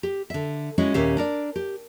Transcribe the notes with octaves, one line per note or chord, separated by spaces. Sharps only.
G4
D3 E5
G#3 C#4 E4 F#4
D#2 A#2 C#4 G4 E5 F5
D4 A#4 D5
G4